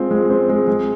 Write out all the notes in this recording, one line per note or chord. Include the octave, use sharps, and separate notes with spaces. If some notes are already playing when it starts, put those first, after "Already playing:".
Already playing: G#3 C4 F4
G#3
C4
G#3
G#3